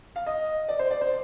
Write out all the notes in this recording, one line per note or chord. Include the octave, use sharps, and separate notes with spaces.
F5
D#5
D5
C5
D5
C5